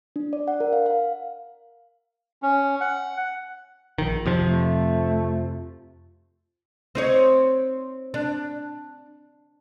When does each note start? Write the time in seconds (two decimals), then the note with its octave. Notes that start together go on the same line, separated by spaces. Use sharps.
0.16 D4
0.33 D5
0.48 F#5
0.60 A#4
0.73 F5
0.86 F5
2.43 C#4
2.81 F#5
3.98 A#1 D#3
4.26 F2 C3 F3
4.45 A3
6.95 C4 D#4 C#5
8.14 D4